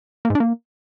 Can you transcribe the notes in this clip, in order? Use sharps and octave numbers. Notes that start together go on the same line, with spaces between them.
A#3
G#2
D4
A#3